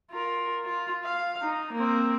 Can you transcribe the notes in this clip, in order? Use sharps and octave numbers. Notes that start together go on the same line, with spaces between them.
F4 A#4
F4
F5
D#4
A#3 C4